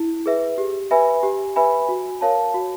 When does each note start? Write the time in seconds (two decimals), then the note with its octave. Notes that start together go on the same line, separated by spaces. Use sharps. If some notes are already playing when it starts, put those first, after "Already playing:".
Already playing: E4
0.26 G#4 B4 E5
0.58 G4
0.91 B4 E5 G#5 B5
1.23 G4
1.56 B4 E5 G#5 B5
1.89 F#4
2.21 A#4 C#5 F5 A5
2.54 F#4